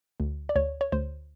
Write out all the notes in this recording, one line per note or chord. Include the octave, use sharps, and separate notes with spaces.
D2
D5
D2 C#5
C#5
D2 C5